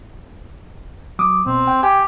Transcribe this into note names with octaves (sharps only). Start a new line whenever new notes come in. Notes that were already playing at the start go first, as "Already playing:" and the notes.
F#3 D6 D#6
B2 C4
G5
G4 G5 G#5